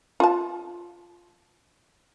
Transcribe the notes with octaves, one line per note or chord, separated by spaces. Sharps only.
F4 A5